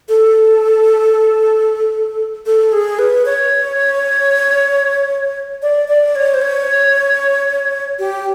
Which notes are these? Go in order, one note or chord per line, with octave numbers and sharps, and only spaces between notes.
A4
A4
G#4
B4
C#5
D5
D5
C#5
C5
C#5
G4